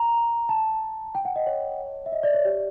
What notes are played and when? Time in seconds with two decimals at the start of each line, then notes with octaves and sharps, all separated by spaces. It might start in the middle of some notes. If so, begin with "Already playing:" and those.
Already playing: A#5
0.49 A5
1.15 G5
1.25 F#5
1.36 D#5
1.47 C#5
2.06 E5
2.12 D#5
2.23 D5
2.34 C#5
2.45 G4